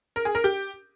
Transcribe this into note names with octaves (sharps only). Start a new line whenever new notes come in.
A#4
G#4
A#4
G4